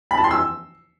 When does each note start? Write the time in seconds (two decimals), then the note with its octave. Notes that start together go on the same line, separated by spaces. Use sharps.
0.11 B5
0.17 A5
0.24 C6
0.31 E6